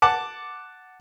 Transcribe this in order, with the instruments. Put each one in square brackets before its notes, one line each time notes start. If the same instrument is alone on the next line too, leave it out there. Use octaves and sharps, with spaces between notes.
[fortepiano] F#5 A5 D6